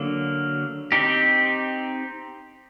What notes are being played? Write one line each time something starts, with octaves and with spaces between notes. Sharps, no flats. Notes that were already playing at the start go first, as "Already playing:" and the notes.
Already playing: D3 F#3 A#3
C4 D#4 G4